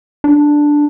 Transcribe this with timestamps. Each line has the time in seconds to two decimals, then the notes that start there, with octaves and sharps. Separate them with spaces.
0.24 D4